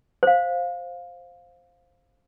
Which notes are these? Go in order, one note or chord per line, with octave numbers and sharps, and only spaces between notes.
C5 F5